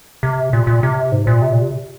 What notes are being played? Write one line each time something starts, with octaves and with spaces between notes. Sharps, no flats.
C3
A#2
A#2
C3
G#2
A#2
C3
A#2
C3